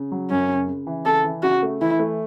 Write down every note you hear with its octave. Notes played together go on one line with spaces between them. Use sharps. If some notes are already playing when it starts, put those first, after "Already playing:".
Already playing: C#3
F#3
F#2 C#4
C#3
C#3
E3
C#3 A4
E3
C#3 F#4
A3
E3 E4
A3